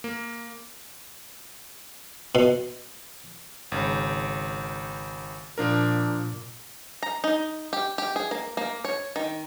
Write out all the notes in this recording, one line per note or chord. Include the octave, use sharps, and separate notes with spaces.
A#3
B2
G#1 C#3
A#2 F3 D4 A#4
A#5
D#4
G4
G4
G#4
A#3
A#3
C#5
D#3